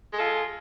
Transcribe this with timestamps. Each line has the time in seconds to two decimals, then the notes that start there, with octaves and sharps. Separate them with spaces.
0.14 G#3
0.17 A4
0.19 F4
0.22 G#4